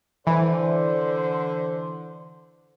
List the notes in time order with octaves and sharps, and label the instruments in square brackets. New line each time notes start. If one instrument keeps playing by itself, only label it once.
[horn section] D3 [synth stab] E3 [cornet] C5